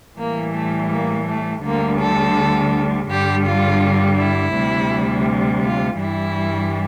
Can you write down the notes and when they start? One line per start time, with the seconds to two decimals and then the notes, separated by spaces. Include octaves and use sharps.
0.17 A2 E3 G3 A#3
0.54 A3
0.89 A#3
1.26 A3
1.63 D2 D3 G3 A#3
1.99 A4
3.09 G2 D3 G3 G4
3.45 F4
4.18 E4
4.54 D2 C3 G3
5.63 F4
5.99 G2 E3 G3 E4